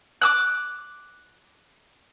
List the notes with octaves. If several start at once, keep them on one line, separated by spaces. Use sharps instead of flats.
D6 E6 F#6